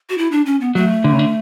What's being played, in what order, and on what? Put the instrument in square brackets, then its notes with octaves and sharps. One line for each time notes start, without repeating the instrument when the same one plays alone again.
[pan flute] F#4
E4
D4
C#4
B3
[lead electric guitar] F#3 [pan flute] A3
[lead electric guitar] D3
C#3
D3